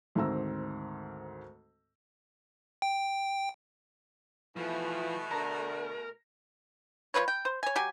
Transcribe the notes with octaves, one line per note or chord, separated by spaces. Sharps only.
D2 G#2 D#3 C4 A#5 E6
G5
B2 E3 F3 A3
D3 A#4 A5 A#5 A#6
F3 A#3 B4 C#5
G5
C5
C#5 G#5
F#3 G4 G#5